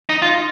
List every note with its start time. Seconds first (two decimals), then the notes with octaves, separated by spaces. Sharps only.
0.09 D#4
0.22 F4